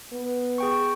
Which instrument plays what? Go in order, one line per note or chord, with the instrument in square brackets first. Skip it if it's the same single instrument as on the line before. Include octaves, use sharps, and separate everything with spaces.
[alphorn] B3
[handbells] G#4 G5 C#6